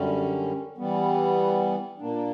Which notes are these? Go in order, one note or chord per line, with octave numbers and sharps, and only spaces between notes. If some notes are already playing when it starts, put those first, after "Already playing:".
Already playing: F#2 D3 G3 C#4
E3 G3 B3
A#2 A#3 D4